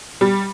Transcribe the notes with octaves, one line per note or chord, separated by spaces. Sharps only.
G3